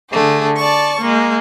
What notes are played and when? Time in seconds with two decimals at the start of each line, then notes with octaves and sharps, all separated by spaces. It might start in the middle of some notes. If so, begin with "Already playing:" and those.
0.11 D3 A3 G#4
0.58 D5 A5 C#6
1.00 G#3 A#3